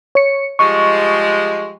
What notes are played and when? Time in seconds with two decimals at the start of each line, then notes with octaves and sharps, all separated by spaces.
0.15 C#5 C#7
0.59 F3 G3 G#3 C#6